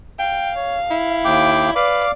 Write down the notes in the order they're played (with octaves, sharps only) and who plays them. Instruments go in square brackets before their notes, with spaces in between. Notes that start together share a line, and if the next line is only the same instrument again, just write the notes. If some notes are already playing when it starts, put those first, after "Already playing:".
[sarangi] F5 [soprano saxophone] G5
[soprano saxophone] C#5
E4
[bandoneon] D#2 G5 D6
[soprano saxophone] B4 [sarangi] D5 [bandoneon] F5 D6